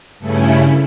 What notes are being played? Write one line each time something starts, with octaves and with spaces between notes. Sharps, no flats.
G2 C#3 A3 C#4 E4